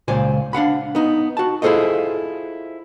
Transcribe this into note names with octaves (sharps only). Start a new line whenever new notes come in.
C#2 A#2 C5 D5 G#5
D4 F5 F#5 B5
B3 D#4
F#4 A5
E4 F4 G#4 A4 C5 D#5